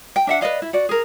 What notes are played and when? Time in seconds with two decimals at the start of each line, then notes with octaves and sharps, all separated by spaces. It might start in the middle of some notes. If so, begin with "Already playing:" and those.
0.16 G5
0.27 D4 E5 F#5
0.41 B4 D5 D#5 F5
0.62 E4
0.73 F#4 D5
0.89 G#4 A#4